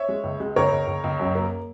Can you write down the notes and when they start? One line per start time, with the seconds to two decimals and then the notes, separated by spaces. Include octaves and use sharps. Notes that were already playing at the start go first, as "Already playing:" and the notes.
Already playing: C#5 E5
0.09 G#3
0.24 C#2
0.40 G#3
0.56 C#2 A#4 C#5
0.72 C#2
0.87 C#2
1.04 C#2
1.20 F#2
1.35 A#3